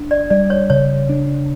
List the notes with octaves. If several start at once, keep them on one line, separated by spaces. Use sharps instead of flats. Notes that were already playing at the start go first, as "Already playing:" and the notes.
Already playing: D4
D5
G3 D5
C#5
C#3 C#5
D4